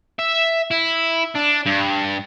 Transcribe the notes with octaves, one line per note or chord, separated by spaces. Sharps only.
E5
E4
D4
G2